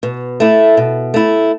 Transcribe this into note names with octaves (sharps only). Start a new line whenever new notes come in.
B2
A3 E4
B2
A3 E4